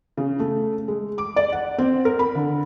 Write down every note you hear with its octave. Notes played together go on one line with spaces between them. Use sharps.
C#3
A3
G#3
D6
D5
F#5
C4
A#4
B5
D3